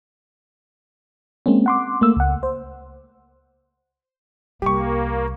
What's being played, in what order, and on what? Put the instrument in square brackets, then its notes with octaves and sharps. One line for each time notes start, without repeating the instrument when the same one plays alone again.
[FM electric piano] G#3 A#3 C4 C#4
F#5 C6 D6
A3 A#3 E6
C#2 F#5
C5
[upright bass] C2 G3 [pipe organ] A#3 [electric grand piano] G4 C#6